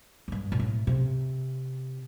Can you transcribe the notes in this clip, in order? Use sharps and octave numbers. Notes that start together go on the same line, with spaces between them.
F2
G2
B2
A2
C3